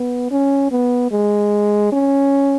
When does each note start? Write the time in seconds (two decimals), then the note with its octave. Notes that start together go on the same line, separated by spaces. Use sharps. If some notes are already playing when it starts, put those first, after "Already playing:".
Already playing: B3
0.31 C#4
0.72 B3
1.11 G#3
1.92 C#4